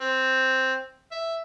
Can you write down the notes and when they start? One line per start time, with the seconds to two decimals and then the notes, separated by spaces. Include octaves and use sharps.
0.01 C4
1.12 E5